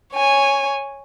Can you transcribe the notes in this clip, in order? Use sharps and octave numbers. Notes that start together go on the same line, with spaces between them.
C#5 G#5